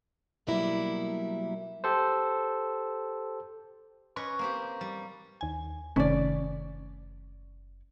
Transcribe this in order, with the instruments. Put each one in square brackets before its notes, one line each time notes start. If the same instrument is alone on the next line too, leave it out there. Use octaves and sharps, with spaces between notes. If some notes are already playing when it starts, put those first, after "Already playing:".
[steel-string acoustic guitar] B2 F#3 G3 A#3 E4
[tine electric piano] G4 A4 C5
[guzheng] C#4 B4 D#5 [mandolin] C#6
[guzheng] A#3 C4 G4
G3
[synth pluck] D#2 G#5
[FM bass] F#1 [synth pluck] C3 D#3 A3 [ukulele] C#4 D5